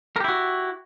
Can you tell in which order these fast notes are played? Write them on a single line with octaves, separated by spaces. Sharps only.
A#4 G4 E4 F#4